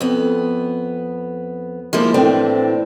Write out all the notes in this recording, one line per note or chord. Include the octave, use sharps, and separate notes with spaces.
F2 B3
F3 G3 G#3 A#3 E4 F4
A2 E3 C4 D4